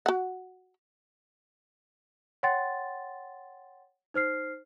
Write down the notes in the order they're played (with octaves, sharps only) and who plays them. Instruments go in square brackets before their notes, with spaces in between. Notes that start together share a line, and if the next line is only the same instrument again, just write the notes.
[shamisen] F#4 F#5
[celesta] C#5 F#5 G5 C6 A6
D#4 C5 F6 C7